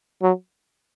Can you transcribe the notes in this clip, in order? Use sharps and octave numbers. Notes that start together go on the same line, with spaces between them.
F#3